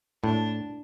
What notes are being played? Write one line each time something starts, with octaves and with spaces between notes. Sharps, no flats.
A2 D4